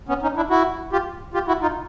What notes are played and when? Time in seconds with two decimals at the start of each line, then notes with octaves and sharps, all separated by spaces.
0.09 B3 C#4
0.23 C#4 D#4
0.37 D4 E4
0.50 E4 F#4
0.92 F4 G4
1.34 F4 G4
1.48 E4 F#4
1.62 D#4 F4